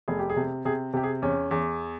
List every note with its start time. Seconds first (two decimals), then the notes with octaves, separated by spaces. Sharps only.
0.08 F1 G#4
0.19 G4
0.30 G#4
0.36 C3
0.65 C3 G#4
0.94 C3 G4
1.03 G#4
1.22 E2 C#4
1.51 E2